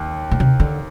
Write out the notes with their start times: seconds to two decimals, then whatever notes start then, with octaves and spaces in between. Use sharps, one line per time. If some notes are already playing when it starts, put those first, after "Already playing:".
Already playing: D#2
0.31 A#2
0.40 C3
0.60 D3